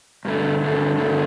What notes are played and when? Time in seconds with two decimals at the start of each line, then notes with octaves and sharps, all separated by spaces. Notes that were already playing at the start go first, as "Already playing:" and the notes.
0.25 G2 D3 A3
0.61 G2 D3 A3
0.97 G2 D3 A3